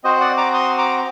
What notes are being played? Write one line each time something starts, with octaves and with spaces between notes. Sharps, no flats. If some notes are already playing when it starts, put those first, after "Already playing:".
C4 F#4 C5 D#5
D5 F#5
A#5 D6
C6 D#6
A#5 D6